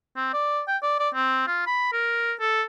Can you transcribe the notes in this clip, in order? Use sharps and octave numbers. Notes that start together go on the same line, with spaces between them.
C4
D5
G5
D5
D5
C4
F4
B5
A#4
A4